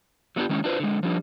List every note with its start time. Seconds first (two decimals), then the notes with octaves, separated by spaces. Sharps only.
0.36 F#3 A3 B3 D4 F4 G4
0.49 D#3 G#3 C#4
0.64 D4 F4 B4 C5
0.80 D3 G#3
1.03 F3 G3 D4